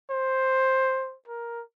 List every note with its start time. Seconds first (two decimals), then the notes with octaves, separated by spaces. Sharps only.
0.10 C5
1.27 A#4